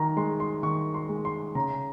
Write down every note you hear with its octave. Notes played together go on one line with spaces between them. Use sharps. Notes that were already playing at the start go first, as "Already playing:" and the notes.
Already playing: D#3 A#5
G#3 C6
C6
D#3 C#6
C6
G#3
C6
C#3 A#5